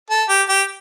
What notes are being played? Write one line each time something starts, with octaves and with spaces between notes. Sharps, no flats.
A4
G4
G4